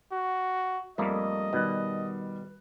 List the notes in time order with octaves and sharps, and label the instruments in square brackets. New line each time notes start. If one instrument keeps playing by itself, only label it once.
[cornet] F#4
[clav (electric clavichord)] F2 A3 A#3 [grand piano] G3 [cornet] D#5
[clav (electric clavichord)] B2 [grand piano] D#3 G3 F#6